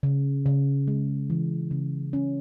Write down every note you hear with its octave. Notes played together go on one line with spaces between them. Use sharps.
C#3
C#3
G#3
E3
C#3
C#4